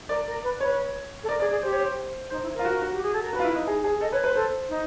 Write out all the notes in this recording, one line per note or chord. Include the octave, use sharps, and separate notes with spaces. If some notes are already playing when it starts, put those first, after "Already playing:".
A#4 D5
A#4
B4
B4 C#5
A4
A#4 D5
G#4 D5
G#4 D5
G4 C5
C#5
C5
D#4 C5
E4
A#4
F4
F#4
F#4
G4
G#4
A4
A#4
F#4 B4
F4
E4
D#4
G#4
G#4
A4 D#5
B4 C#5
B4 C5
A4 C5
D#4